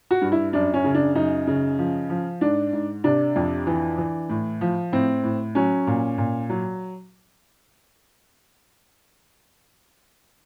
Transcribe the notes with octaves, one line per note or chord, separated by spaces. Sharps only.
F#4
G2
E4
F#2 D4
C#4
C#3
D4
F#2 D#4
C#3
F3
F3
G#2 D4
G#2
C3 D4
F2
E3
E3
A2
F3
A2 C4
A2
F#3 C#4
A#2
A#2
F#3